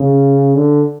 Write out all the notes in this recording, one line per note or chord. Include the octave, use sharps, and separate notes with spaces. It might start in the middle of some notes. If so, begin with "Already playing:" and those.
Already playing: C#3
D3